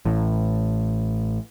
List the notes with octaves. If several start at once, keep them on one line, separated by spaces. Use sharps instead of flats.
A1 A2